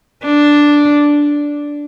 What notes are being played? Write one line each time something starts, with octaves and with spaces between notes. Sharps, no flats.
D4